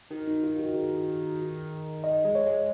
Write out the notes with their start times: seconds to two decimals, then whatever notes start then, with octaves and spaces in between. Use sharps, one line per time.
0.10 D#3 F#4
0.27 D#4
0.44 F4
0.59 F#4
0.75 G#4
2.03 D#3 D#5
2.25 G#3
2.35 C#5
2.46 G#3